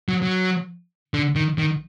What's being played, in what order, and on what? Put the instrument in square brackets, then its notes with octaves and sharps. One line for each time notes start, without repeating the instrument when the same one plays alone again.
[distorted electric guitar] F#3
F#3
D3
D#3
D#3